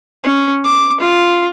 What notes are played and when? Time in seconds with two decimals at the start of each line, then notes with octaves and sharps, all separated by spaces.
0.24 C#4
0.64 D6
1.01 F4